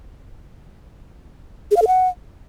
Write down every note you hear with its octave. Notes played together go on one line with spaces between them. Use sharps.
G#4
F5
A4
F#5